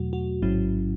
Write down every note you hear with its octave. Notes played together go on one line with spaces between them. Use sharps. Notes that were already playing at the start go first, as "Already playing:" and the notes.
Already playing: E2 B2 F#3 A3 F#4
F#4
A1 G#2 F#3 C#4 E4